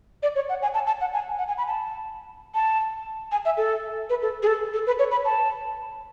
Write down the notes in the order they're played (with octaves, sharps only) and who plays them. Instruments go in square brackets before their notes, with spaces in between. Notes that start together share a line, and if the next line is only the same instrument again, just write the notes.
[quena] D5
C#5
F#5
G#5
A5
A5
F#5
G#5
F#5
G#5
B5
A5
A5
G#5
E5
A4
B4
A4
G#4
A4
A4
B4
C#5
B5
A5